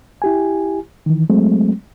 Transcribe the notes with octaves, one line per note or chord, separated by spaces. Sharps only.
E4 G4 G#5
D#3 E3
F#3 G#3 A3 C4